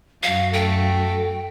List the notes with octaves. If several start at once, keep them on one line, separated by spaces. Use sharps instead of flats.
F#2 F#4 F5
A3 G5